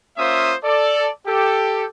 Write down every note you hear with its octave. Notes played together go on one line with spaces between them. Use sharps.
A#3 C#4 F4 C5 E5 D#6
A4 D5
G4 A4